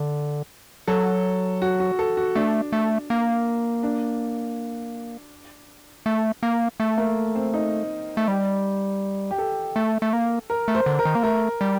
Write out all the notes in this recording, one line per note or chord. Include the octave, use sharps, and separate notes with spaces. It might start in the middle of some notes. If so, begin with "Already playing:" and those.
Already playing: D3
F#3 A4
F#4
F#4
A4
F#4
A3 D4
A3
A#3
D4
A3
A#3
A3
A#3
C4
D#4
A3
G3
G4
A4
A3
A3
A#3
A#4
A3
C5
D3
A#4
D#3
A#3
A3 A#4
G3